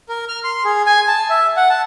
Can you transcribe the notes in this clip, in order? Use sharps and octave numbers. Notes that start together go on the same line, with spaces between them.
A#4
F6
C6
G#4
G#5
A5
E5
F#5
A5